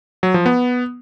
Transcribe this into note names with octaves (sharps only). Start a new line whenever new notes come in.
F#3
F3
B3